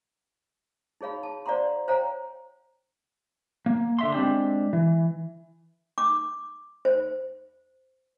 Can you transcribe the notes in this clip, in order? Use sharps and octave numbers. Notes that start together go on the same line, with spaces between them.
D#4 G#4 C#5 F5 B5
A5
C5 D5 F5 F#5 A#5 C6
C5 C#5 F5 G5 G#5 A#5
A#3
D3 E5 C6
G#3 C4 D4 G4
E3
D6
C5